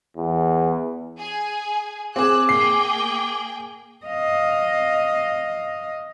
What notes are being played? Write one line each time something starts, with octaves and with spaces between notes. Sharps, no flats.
E2
G#4 G#5
C4 G#4 D6 E6 F#6
A#3 G#4 G5 C7
D#5 F5